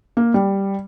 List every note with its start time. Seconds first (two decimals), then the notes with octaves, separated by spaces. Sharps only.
0.17 A#3
0.34 G3